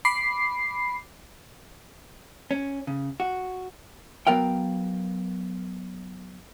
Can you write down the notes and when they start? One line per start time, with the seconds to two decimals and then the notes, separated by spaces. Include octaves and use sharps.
0.05 B5 D6 C7
2.51 C#4
2.87 C#3
3.20 F#4
4.27 F#3 B3 A#4 F5 G5